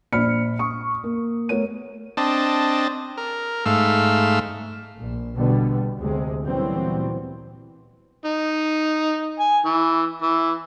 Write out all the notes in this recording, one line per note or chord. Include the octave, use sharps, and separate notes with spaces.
A#1 C5 D5 B5 F6 C#7
C#6 D#6
A#3
A3 B3 A#4 C#5 D#7
C4 D4 D#5 A5
A#4
G#2 A3 F5 E6
A#1
B2 D3 G3 B3
D2 C3 G#3
A#2 E3 F#3 G3 B3 C4
D#4
G#5
E3
E3